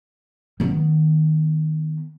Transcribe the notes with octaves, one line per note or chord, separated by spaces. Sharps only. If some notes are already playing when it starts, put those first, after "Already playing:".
D#3 B3